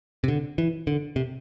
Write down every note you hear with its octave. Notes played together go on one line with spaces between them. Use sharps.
C3
D3
E3
D3
C3